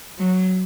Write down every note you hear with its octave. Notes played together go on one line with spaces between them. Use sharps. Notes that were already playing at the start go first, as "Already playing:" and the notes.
F#3